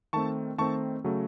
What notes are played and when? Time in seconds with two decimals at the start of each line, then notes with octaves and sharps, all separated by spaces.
0.13 D#3 A3 C4 A5 C#6
0.58 D#3 A3 C4 A5 C#6
1.04 C#3 F#3 A3